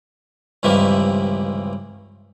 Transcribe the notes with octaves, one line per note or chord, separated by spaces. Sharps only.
C#2 G2 C3 D#3 E3 A#3